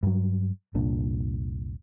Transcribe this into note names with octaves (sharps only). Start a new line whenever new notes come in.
G2 F#3
F1 C2 A#2 D4